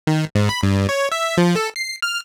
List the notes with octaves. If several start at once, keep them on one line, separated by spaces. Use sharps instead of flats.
D#3
G#2
B5
G2
C#5
E5
F3
A4
C7
F6